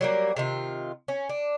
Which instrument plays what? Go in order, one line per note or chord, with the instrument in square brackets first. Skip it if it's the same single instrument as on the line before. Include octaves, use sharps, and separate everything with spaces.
[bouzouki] F#3 G3 A#3
C3 D#3 F4
C#4
D4